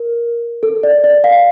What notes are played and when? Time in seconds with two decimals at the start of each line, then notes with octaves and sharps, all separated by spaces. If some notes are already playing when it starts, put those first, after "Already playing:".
Already playing: A#4
0.63 A4
0.83 D5
1.04 D5
1.24 F5